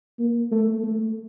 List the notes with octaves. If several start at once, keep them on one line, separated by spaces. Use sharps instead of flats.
A#3
A3
A3